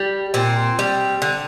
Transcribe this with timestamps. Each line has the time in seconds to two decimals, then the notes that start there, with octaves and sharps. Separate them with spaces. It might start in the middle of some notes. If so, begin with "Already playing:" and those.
Already playing: G3
0.34 A#2 C4
0.79 G3
1.22 D3